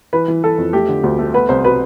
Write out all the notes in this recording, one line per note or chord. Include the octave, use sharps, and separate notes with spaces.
E3 B4
E3
E3 A4
F2
A3 G4
D3
D2
A3
B3 B4
C2 C5
B2 B4